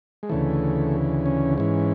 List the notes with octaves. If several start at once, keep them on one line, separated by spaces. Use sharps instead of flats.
G#3
D2 C#3 E3 A3
C#4
G#2 E3 C#4